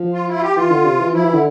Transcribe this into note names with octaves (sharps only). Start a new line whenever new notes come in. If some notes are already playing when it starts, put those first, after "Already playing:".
Already playing: F3
F4
E4
F4
G4
E3 F4
D3
C3
E3
F3 E4
E3
D3